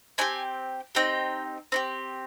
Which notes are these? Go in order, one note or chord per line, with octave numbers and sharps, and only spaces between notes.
C4 D#4 G4 G#5
C4 D#4 G4 G5
C4 D#4 G4